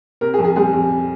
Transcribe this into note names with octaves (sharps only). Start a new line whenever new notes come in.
C3 A#4
G#4
F2
G#4
G3 G#4
F2